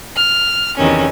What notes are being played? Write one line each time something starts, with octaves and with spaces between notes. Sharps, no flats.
F6
E2 C3 D#3 C#4